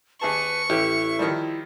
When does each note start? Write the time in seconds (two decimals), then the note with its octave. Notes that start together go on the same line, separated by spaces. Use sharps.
0.21 D#2 G#4 B4 A5 C#6
0.70 A1 E4 G4
1.19 D#3 F3 G3